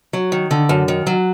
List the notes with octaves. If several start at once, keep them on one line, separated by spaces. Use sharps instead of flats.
F#3
D#3
D3
F#2
D#3
F#3